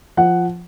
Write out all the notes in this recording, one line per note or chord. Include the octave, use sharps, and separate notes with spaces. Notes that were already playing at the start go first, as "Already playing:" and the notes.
F3 F#5